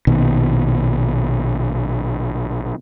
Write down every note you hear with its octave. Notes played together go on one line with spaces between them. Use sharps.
A#1 B2 D#3